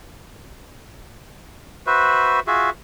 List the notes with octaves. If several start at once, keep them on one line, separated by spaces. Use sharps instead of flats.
F#4 B4 C5 E5
F4 F#4 G#4 E5